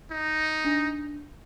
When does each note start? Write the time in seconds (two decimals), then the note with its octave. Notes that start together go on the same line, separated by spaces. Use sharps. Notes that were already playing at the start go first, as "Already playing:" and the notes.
0.11 D#4
0.65 D4